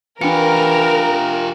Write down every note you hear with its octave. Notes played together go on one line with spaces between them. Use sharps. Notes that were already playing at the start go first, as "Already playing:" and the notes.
E3 D4 F4 G4 A#4 C#7